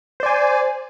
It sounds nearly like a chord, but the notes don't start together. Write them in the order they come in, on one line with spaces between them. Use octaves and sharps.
C5 D5 G#5